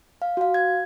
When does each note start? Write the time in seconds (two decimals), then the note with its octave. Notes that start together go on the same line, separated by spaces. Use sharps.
0.22 F5
0.37 F#4 F5
0.54 G#6